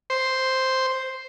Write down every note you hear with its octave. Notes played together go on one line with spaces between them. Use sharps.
C5